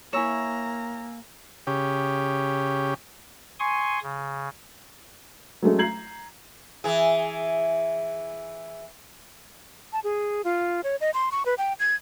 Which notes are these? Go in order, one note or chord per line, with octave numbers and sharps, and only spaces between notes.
A#3 E4 C#5 G#5 A#5 E6 E7
C#3 G4
G#5 C6 C#6 D#6
C#3
F#3 G#3 A3 C#4
A#5 G6 G#6 C7 F#7
E3 G#4
A5
G#4
F4
C#5
D#5
C6
C#6
B4
G5
G#6